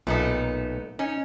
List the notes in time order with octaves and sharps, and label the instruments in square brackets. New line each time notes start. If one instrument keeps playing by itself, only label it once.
[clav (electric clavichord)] B1 A#2 [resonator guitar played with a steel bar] A3 B3 D#4
[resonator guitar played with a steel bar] C#4 [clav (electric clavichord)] D#4